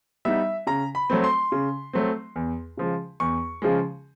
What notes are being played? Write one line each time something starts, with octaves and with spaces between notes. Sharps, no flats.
G3 B3 D#4 E5
C#3 A#5
B5
F#3 A3 C4
C6
C#3
F#3 A3 C4
E2
C#3 F3 G#3
E2 C#6
C#3 F3 G#3